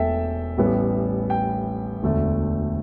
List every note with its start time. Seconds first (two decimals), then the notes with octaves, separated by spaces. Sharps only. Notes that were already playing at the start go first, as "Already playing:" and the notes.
Already playing: E1 E2 A3 A4 E5 G5
0.57 A1 A2 G3 B3
1.30 G5
2.03 E1 D2 D3 A3